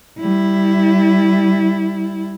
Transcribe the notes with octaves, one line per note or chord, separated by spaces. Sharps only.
G3 E4